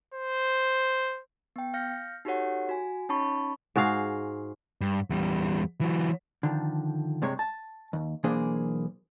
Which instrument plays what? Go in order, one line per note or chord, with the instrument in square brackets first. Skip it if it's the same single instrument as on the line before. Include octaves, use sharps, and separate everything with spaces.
[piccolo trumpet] C5
[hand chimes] B3 G5
F5 F6 G6 A#6 C#7
D#4 F#4 G4 A4 C#5 F#5
F#4 G#5
C#4 D#4 C#5 A5 B5 C#6
[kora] G#2 F#4 G#4 F5
[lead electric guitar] G2
E2 G3
E3 F#3
[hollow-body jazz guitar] D3 D#3 F3
G2 C3 G#3 C#5
A5
D#2
B1 E3 A#3 D4 G#4 C5